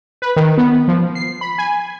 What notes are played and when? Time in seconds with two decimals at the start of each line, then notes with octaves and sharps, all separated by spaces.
0.22 B4
0.36 D#3
0.58 B3
0.88 F3
1.15 C7
1.41 B5
1.58 G#5